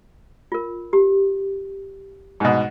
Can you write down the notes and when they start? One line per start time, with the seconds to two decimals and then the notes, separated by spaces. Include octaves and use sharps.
0.52 F4 A#4
0.93 G4
2.40 G#2 B2